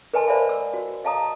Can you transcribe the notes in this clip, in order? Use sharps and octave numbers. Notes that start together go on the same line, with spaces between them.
A#4 B4 D#5 G#5 A5 C6
A#4 C5 D5 E5 F5 B5
E6
F#4
D#5 F5 A5 A#5 D#6